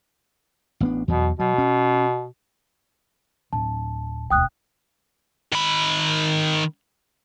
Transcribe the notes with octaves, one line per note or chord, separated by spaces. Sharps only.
A1 B3 D4
E2 B2 E3 F#3
B2 F#3
C#4
D1 A5
E1 D2 G5 D#6 F#6
D#3 B5